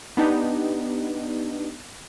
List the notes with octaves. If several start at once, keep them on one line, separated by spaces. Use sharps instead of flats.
B3 D4 D#4 G4